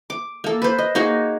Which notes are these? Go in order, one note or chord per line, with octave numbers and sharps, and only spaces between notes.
D6
A#3 A4
B4 C5
D#5
A#3 D#4 F#4 G#4